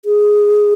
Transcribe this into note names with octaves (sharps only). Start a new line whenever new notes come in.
G#4